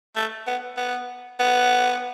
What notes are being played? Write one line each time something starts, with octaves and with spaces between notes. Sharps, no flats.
A3
B3
B3
B3